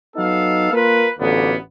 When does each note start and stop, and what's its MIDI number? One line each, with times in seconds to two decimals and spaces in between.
0.17 0.73 54
0.17 0.73 59
0.17 0.73 63
0.17 0.73 69
0.17 0.73 77
0.73 1.09 58
0.73 1.09 65
0.73 1.09 70
0.73 1.09 71
1.20 1.55 33
1.20 1.55 38
1.20 1.55 50
1.20 1.55 58
1.20 1.55 59